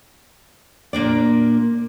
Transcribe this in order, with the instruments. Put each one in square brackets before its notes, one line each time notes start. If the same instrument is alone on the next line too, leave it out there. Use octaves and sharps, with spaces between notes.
[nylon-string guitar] A#2 A#3 D4 D5